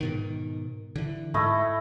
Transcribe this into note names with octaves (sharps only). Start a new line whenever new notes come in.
G#2 B2 D#3
D3 E3
G#2 A3 E4 D#5